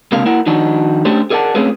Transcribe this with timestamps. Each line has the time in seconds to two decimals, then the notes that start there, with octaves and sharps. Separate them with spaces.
0.12 C#2 C3 A#3 D4 F5
0.25 A#3 E4 A#4 F#5
0.46 D#3 F3 D4 D#4 F#4
1.05 A3 C#4 D4 G4 A4 C5
1.30 G#4 A#4 D5 D#5 F#5 A5
1.55 A3 C4 C#4 F4 G#4 B4